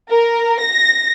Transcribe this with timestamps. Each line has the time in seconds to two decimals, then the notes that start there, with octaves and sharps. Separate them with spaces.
0.11 A#4
0.60 A#6